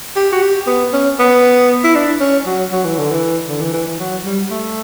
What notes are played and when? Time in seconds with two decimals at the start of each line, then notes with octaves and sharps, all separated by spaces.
0.16 G4
0.32 F#4
0.42 G4
0.67 B3
0.93 C#4
1.19 B3
1.84 E4
1.95 D4
2.20 C#4
2.46 F#3
2.72 F#3
2.84 E3
2.98 D3
3.11 E3
3.48 D3
3.61 E3
3.73 E3
3.87 E3
4.00 F#3
4.25 G3
4.50 A3